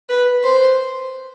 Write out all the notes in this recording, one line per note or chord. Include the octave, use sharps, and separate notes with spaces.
B4
C5